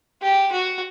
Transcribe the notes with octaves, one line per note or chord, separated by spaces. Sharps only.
G4
F#4